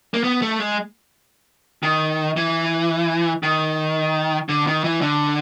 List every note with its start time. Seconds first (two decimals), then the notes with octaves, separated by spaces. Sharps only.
0.14 A#3
0.24 B3
0.42 A3
0.60 G#3
1.83 D#3
2.37 E3
3.43 D#3
4.49 D3
4.67 D#3
4.84 E3
5.01 D3